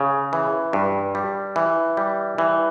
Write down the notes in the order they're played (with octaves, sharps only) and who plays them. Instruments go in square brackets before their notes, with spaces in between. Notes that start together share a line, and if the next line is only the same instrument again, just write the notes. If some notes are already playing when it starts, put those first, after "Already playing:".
Already playing: [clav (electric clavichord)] C#3
E3
G2
G3
E3
G3
E3